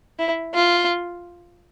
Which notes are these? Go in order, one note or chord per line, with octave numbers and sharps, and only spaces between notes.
E4
F4